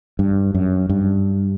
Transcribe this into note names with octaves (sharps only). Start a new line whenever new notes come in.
G2
F#2
G2